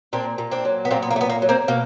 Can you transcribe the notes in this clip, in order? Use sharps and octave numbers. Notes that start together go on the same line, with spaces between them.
A#2 C4 D4
A#2
C4 D4
F#3
B3
A#2 A#3 C4
B3
A#3
A3
B3
A#3
F#3
A#3 C4
B2 A#3